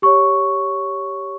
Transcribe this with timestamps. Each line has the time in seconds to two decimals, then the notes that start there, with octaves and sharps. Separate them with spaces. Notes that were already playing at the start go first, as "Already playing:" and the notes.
0.02 G4 C#5 C#6